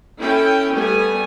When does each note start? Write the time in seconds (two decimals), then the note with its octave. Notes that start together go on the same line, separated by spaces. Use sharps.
0.20 C#4 E4 A4 G5
0.76 G3 A3 B3 G#5